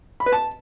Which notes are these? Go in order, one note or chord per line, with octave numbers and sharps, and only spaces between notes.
B5
B4
A5